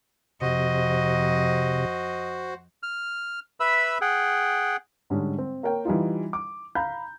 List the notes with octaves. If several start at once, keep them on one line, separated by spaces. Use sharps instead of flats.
F2 C3 F#4 C5 D#5
F6
B4 E5 B5 E6
G#4 F#5 G5
G#2 D3 G3 G#3 C#4
C4
A#3 A#4 C#5 G5
E3 G3 D#4 F4
D6
F5 A#5 B5 G6